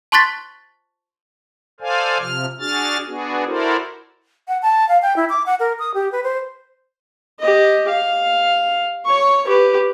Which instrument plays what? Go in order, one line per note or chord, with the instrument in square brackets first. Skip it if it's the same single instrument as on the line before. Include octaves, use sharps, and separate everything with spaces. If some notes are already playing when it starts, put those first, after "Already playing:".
[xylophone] A5 C6 C#6 F#6 A6 B6
[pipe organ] A4 C5 D5 F5 G#5
C3 F3 F6
D4 F#4 G#4 F6 A6
B3 D4 F#4 G#4
E4 F#4 A4 A#4 C5 D5
[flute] F#5
A5
F5
G5
E4
D6
F#5
A#4
D#6
G4
B4
C5
[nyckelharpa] G4 D#5
F5
C#5 C#6
G4 B4